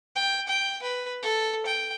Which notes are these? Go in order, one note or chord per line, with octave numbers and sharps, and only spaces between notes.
G5
G5
B4
A4
G5